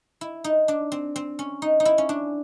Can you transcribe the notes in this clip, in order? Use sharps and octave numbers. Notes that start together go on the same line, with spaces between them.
E4
D#4
D4
C4
C4
C#4
D#4
D#4
E4
C#4
D4